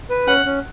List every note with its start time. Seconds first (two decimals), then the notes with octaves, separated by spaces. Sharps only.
0.10 B4
0.28 C#4 F#5
0.45 C#4